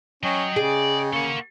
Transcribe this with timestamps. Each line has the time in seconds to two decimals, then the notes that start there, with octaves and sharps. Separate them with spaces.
0.23 F#3 C#4 D#5 G5
0.56 C#3 G#4 D5
1.13 A#3 A4 F#5 C#6